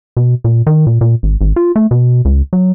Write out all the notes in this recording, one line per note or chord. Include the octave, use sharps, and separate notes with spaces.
B2
A#2
D#3
A#2
A#2
G#1
G#1
F4
A3
B2
C#2
F#3